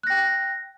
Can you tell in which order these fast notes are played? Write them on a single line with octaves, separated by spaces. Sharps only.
F#6 A#6 G5